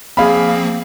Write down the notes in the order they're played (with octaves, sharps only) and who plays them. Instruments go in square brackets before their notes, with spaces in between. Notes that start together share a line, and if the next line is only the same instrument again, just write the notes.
[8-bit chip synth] F3 A#3 C4 [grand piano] G#4 F5 B5